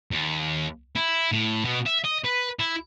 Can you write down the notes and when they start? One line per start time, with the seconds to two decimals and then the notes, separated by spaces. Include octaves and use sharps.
0.11 D#2
0.96 E4
1.32 A2
1.65 B2
1.86 E5
2.05 D#5
2.25 B4
2.60 E4